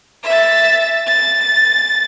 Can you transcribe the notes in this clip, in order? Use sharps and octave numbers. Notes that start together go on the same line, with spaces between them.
E5 A6
A6